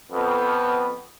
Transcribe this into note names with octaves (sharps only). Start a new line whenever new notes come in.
F2 B3